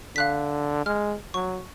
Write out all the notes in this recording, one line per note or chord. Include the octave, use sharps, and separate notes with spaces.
D3 F5 F#6 B6
G#3 F6
F#3 C#6